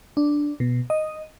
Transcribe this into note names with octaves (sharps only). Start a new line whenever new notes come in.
D4
B2
D#5